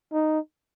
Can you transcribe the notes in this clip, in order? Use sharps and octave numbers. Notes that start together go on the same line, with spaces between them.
D#4